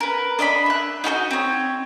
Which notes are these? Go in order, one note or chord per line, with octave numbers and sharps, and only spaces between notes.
A#4 B4
D4 D#5 E5 B5
E5 F#6
D#4 F#4 A4 D#5
C4 C#5